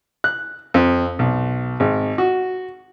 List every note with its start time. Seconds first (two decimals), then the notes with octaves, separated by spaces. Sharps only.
0.24 F#6
0.74 F2
1.19 B1
1.80 G#1
2.18 F#4